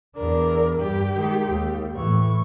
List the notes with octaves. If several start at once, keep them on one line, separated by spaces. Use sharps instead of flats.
E2 D4 A#4
G2 G4
D#3 G#3
D#2
A2 E3 C#6